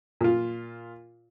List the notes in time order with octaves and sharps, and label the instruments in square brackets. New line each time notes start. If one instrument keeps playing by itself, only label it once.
[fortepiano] A#2 F4